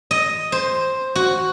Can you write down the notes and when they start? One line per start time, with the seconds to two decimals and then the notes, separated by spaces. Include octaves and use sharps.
0.11 D#5
0.52 C5
1.15 F#4